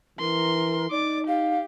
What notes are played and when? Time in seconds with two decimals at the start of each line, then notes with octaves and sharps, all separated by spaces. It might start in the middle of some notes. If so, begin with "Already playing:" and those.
0.19 E3 A#4 C6
0.91 D#4 D5 D6
1.27 G4 F5